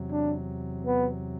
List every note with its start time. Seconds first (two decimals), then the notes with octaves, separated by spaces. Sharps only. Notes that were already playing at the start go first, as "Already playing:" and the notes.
Already playing: E2 C3 F#3
0.12 D4
0.86 B3